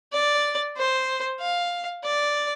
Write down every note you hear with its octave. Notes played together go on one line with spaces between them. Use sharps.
D5
C5
F5
D5